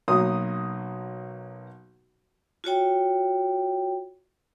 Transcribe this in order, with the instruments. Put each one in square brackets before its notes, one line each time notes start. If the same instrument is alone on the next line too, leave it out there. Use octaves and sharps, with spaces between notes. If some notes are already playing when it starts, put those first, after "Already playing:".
[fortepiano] B1 F#3 A#3 C6 D#6
[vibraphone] F4 F#4 C#5 G5